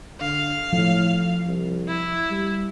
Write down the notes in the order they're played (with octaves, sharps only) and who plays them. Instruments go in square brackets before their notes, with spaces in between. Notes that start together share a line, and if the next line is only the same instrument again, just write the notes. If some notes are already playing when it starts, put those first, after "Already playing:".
[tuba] D3 [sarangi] F5
[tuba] A2 [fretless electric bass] F3
[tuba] C2
[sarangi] E4
[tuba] G3